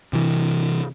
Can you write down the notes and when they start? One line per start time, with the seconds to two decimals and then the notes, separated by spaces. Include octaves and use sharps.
0.13 C3 E3